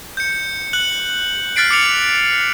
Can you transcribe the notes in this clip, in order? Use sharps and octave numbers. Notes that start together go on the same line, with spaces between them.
G6 C#7
F#6 F#7
F6 F#6 A6 B6 C7 D7
D6 C#7 F7